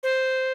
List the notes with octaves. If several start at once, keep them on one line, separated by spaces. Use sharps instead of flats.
C5